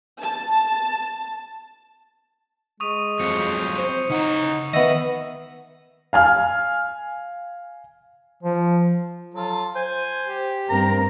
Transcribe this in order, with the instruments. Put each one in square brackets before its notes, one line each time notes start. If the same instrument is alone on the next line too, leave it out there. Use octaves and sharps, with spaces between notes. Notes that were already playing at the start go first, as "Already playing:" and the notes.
[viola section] A5
[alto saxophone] G#3 [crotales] C#6 D#6 D#7
[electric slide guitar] F#3 C4 F4 [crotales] C#7
[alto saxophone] C5
[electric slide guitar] C#3 F#5 A#5 [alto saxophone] D#4
[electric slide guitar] D#3 [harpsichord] B3 D#5 [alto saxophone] E5
[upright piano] F5 G#5 F6
[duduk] F3
[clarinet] F#3 [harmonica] F4 A4
[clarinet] C5 [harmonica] G#5
[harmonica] G4
[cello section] G2 C4 A#4 [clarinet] A#5